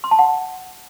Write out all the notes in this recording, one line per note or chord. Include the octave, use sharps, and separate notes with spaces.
C6
A5
F#5